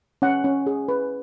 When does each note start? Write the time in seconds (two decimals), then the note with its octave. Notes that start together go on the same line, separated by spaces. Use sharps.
0.22 C#4 F#5
0.44 C#4
0.67 G#4
0.88 B4